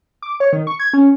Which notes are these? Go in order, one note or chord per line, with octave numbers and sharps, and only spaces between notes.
D6
C#5
D#3
C#6
G#6
C#4